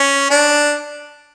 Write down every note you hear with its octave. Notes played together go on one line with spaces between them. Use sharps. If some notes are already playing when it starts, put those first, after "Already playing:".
Already playing: C#4
D4